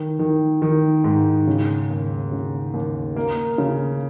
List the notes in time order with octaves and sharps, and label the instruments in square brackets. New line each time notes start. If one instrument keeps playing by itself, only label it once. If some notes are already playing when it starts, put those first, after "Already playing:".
Already playing: [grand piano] D#3
D#3
D#3
G#2
C#3
D#2
C#3
D#2
A#3
C#3